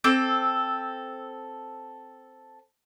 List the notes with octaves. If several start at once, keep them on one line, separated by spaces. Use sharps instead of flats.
C4 A4 D6